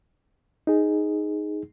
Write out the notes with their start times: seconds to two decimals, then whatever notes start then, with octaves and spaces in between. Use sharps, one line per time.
0.67 D#4 G#4